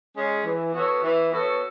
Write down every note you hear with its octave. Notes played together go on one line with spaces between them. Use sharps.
G#3 C#4 G#4
E3
B3 F#4 A4 C#5
E3
B3 F#4 A4 C#5